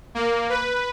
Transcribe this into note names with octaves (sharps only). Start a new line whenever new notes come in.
A#3
B4